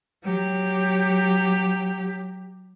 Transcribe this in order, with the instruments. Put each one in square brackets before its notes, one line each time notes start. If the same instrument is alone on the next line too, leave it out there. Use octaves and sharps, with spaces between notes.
[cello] F#3 G4